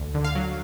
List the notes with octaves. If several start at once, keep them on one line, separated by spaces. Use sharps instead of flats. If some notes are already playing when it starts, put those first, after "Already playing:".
Already playing: D2
D3
F5
F#3